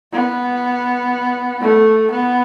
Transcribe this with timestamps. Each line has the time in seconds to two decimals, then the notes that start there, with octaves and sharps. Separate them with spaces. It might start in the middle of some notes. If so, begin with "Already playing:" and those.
0.13 B3
1.61 A3
2.11 B3